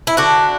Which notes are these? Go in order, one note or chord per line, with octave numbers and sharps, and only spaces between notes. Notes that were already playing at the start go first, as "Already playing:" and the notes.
E4
D3 D4 F#4